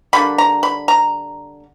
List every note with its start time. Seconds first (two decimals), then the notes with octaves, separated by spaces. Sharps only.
0.13 D3 G3 A#3 B5
0.38 A#5
0.63 B5
0.88 A#5